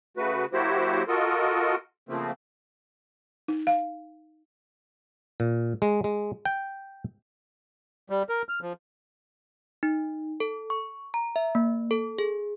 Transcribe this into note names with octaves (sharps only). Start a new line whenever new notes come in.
C#3 A3 F#4 B4
F#3 A#3 E4 F#4 G4 C5
F4 F#4 A4 A#4 D#5
C#3 F3 A3 A#3 C4
D#4
F5
A#2
G#3
G#3
G5
G3
A#4
F6
F3
D#4
A4
C#6
A#5
E5
A#3
A4
G#4